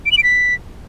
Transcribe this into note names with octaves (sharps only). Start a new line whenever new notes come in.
D7
F#7
D7
B6